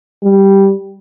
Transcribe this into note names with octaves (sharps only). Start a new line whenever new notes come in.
G3